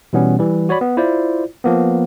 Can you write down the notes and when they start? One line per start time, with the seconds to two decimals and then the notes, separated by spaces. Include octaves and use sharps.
0.13 B2 E3 G3 B3 C#4
0.39 E3 G3
0.69 F#4 C#5 D5 B5
0.81 B3
0.97 E4 F4 C5 D5
1.64 F3 A#3 B3